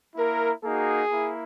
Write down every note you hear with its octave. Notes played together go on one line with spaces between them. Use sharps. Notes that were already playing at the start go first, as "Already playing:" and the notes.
A#3 E4 A#4
A#3 D#4 F#4 G#4
A#3 E4